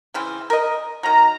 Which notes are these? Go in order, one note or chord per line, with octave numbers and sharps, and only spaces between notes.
C#3 E3 C4
A#4 D#5
D#3 F#3 A#5